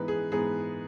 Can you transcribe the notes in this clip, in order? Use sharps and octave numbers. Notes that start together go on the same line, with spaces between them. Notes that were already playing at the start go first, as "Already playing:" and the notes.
Already playing: G#2 E3 B3 B4
G#4
G#2 E3 B3 G#4